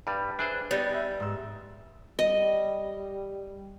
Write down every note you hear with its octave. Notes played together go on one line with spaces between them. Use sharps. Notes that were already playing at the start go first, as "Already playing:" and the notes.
G2 G3 B4
D4 G#4 C5 E5 G#5 F#6
G3 B3 D#4
E5
G#2 E6
G3 D#5